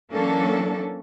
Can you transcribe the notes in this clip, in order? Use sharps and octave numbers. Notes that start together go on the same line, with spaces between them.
E3 F#3 A#3 C#4 D4 A4